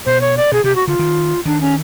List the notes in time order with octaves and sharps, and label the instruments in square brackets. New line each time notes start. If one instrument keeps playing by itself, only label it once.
[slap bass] B2 [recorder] C5
[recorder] C#5
D5
[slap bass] B2 [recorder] G#4
[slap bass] C3 [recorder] G4
[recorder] F#4
[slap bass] D3 [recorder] F4
[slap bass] D#3
[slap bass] D#3 [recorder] D4
[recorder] C#4